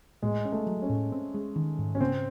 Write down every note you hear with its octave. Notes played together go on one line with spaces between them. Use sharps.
A2 G#3
C#4
A3
F#3
C#4
A2
C4
G#3
D#3
G#2
C#4
C#3 C4